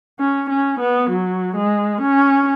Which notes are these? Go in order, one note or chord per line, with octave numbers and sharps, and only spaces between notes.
C#4
C#4
B3
F#3
G#3
C#4